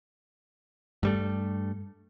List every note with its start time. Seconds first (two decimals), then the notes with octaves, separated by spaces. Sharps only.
1.03 G2 G3 A3